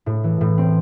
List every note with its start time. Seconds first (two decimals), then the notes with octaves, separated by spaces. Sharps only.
0.06 A2
0.24 E3
0.41 A2
0.58 C4